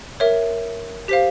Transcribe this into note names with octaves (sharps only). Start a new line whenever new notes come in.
A#4 C#5 E5
G4 C5 F5 B6